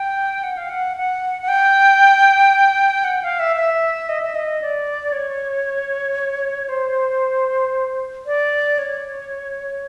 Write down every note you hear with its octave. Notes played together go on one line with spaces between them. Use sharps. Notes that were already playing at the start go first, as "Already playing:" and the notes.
Already playing: G5
F#5
F5
F#5
F#5
F#5
G5
F#5
F5
E5
E5
D#5
E5
D#5
D5
C#5
C5
D5
C#5